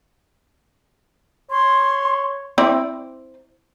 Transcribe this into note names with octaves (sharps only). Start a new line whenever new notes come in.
C#5 C6
C4 E4 D5